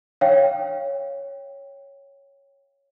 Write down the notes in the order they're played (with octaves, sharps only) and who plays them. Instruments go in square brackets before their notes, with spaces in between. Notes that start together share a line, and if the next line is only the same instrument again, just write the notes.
[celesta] C#5 F5 G5